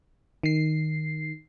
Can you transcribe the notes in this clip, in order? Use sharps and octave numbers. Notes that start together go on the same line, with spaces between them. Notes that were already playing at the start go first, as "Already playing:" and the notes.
D#3 C7